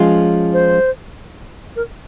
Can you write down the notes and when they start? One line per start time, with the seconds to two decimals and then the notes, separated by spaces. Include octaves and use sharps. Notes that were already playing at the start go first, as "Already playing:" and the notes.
Already playing: F3 G#3 C#4 F4
0.53 C5
1.76 A#4